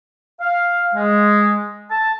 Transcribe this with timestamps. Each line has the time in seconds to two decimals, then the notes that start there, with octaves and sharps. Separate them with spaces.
0.41 F5
0.95 G#3
1.91 A5